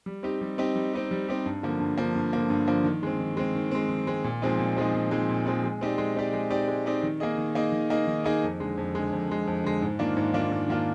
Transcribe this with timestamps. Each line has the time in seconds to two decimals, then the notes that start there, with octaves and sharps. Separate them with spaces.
0.06 G3
0.23 C4 D#4 G4
0.41 G3
0.58 C4 D#4 G4
0.76 G3
0.93 C4 D#4 G4
1.11 G3
1.29 C4 D#4 G4
1.46 G2
1.63 D3 F3 A#3
1.80 G2
1.98 D3 F3 A#3
2.15 G2
2.33 D3 F3 A#3
2.50 G2
2.67 D3 F3 A#3
2.84 D#3
3.03 G#3 C4
3.20 D#3
3.37 G#3 C4
3.55 D#3
3.71 G#3 C4
3.89 D#3
4.07 G#3 C4
4.24 A#2
4.42 F3 G#3 C4 D#4
4.59 A#2
4.76 F3 G#3 C4 D#4
4.94 A#2
5.11 F3 G#3 C4 D#4
5.29 A#2
5.46 F3 G#3 C4 D#4
5.64 G#3
5.81 C4 D#4 G4 D5
5.98 G#3
6.16 C4 D#4 G4 D5
6.33 G#3
6.50 C4 D#4 G4 D5
6.68 G#3
6.86 C4 D#4 G4 D5
7.03 D#3
7.20 A#3 D#4 G#4 D#5
7.38 D#3
7.55 A#3 D#4 G#4 D#5
7.72 D#3
7.90 A#3 D#4 G#4 D#5
8.07 D#3
8.24 A#3 D#4 G#4 D#5
8.43 F2
8.60 D3 G#3
8.77 F2
8.95 D3 G#3
9.12 F2
9.29 D3 G#3
9.47 F2
9.64 D3 G#3
9.82 G#2
9.99 D#3 A#3 D4 F4
10.17 G#2
10.34 D#3 A#3 D4 F4
10.51 G#2
10.68 D#3 A#3 D4 F4